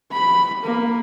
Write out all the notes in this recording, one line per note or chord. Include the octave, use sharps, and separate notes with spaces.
B5
A#3